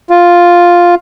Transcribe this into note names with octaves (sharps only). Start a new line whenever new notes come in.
F4